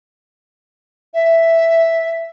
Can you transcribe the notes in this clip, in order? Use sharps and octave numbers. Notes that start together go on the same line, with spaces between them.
E5